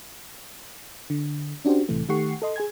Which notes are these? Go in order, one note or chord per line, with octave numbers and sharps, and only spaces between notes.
D3
C#4 D4 F#4 G4 C5
C2 A2 C3 E3 A3
D#3 A3 G4 F#5 C#6 C7
A4 D#5 C6
G#4 G#5 G#6